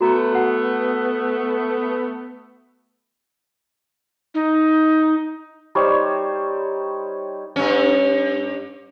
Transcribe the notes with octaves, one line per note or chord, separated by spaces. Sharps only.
A3 B3 F#4 A#5
B4 F#5
D#4
G3 D#4 C5 C#5
G2 C#4